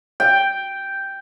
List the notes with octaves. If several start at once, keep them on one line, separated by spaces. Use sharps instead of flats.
G5